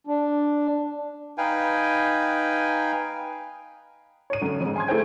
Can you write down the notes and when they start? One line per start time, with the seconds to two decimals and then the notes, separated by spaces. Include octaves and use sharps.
0.07 D4
1.38 D#4 B4 F5 G5 G#5
4.30 C#5 D#7
4.41 F#2 D3
4.60 F2 G#2
4.76 G#5 C6 G#6
4.88 A3 E4 G#4 B4 C5 G5